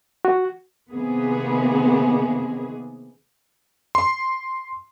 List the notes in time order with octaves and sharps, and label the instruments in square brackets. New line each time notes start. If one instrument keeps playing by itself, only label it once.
[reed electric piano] F#4
[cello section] C3 D#3 A#3 B3 G#4
[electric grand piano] C6